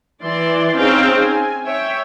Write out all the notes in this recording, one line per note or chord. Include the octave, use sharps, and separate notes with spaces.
E3 D5 C6
C4 C#4 D#4 G#4 F5 G5
G#5
C#5 E5 G5